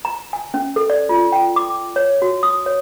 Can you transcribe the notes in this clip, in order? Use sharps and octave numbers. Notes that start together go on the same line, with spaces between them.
A#5
G#5
C#4
A4
D5
F4
G5
D6
C#5
F#4
D#6
C#5